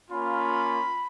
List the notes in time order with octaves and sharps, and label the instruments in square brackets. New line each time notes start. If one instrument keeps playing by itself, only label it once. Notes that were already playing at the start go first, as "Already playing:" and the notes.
[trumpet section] A#3 C#4 F4 B5